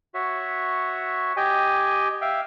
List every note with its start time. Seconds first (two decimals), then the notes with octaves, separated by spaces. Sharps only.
0.14 F#4 C#5 E5
1.37 G4 D#5 G5 G#5
2.22 E5 F5 G5